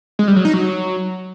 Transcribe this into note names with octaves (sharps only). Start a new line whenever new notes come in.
G#3
G3
F#3
D#4
F#3